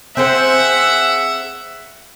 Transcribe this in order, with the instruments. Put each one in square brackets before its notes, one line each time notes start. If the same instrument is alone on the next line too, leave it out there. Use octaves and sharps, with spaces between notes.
[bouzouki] C4 G#4 C5 [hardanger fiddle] E5 F#5